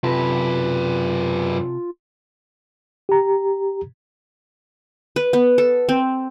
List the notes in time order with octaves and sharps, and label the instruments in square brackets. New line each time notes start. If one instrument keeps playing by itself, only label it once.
[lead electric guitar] F#2 B4 [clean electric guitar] C3 G4 A4 [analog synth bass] F4
[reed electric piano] G4 A#5
[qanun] B4
B3
A4
C4